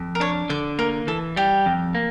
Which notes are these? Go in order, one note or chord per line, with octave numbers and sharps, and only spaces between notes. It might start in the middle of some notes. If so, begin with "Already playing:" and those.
Already playing: F2
A#4
D4 C#5
D3 D5
A#3 A#4
E3 A4
G3 G4
F2
A#3